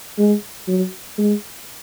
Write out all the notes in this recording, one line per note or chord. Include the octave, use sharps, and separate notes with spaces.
G#3
F#3
G#3